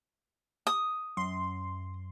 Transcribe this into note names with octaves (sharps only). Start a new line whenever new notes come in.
D#6
F#2 C6